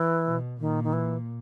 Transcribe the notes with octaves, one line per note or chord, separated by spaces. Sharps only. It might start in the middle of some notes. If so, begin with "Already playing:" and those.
Already playing: E3
B2
A#2 D#3
D#3
E3